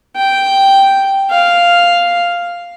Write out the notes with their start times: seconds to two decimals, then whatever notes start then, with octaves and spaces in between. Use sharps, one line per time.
0.17 G5
1.31 F5